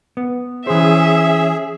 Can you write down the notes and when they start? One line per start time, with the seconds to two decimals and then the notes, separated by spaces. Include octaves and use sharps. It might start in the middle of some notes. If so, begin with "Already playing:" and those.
0.17 B3
0.67 E3 C#4 G#4 C5 E5